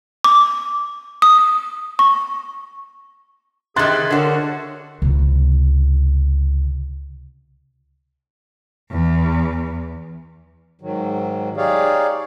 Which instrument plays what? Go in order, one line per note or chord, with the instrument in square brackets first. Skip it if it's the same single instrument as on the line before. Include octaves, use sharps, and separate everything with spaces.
[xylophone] D6
D#6
C#6
[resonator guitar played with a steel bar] C3 D#3 [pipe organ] G#4 E5 G#6 [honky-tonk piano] C6 F#6 A6
[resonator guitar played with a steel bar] D3 F#4 [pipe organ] D4 A#4 C#5
[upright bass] C#2 C3
[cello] E2
[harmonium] G#2 D#3 F#3
D#4 G4 G#4 C#5 D5 F5